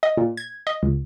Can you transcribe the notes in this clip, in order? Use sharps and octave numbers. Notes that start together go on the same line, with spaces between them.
D#5
A#2
G#6
D#5
C#2